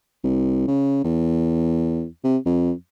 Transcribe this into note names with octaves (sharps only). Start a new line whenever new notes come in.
C2
C#3
E2
C3
F2